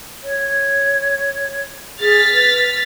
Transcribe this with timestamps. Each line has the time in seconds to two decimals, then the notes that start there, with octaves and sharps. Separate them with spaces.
0.23 C#5
2.00 G#4 F6 A6 B6
2.32 B4